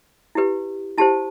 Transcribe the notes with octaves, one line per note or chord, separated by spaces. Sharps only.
E4 G4 B4
E4 G4 C5 A5